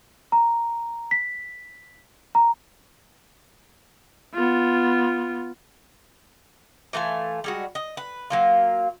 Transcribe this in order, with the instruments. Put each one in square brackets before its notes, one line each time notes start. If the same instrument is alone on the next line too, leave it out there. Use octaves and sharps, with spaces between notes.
[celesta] A#5
B6
A#5
[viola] B3 F4
[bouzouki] E3 A3 F4 G#5
G3 G#3 F#4
D#5
B4
F#3 A#3 F4